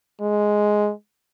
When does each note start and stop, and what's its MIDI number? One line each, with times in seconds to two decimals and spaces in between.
0.21 0.91 56